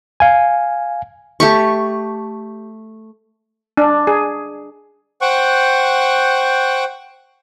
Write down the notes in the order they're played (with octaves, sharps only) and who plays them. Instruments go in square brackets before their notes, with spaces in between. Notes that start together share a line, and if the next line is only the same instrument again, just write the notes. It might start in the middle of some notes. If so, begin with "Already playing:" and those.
[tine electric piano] F5 G#5
[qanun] A3 G4 C#6
[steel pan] D4
G#4
[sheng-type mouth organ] C5 F#5 G5 C#6 F#6